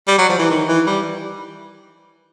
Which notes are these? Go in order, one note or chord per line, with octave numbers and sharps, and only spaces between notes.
G3
F#3
F3
E3
D#3
E3
G3